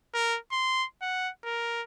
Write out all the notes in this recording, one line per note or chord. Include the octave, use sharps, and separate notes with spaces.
A#4
C6
F#5
A#4